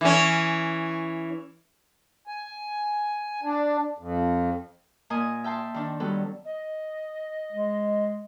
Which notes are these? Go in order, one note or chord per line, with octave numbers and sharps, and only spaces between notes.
E3 C#4
G#5
D4
F2
A#2 A#3 A#4 D#5 G#5 D#6
E5 G5 A5 C6
D#3 D4
F#3 G3 B3 A4
D#5
G#3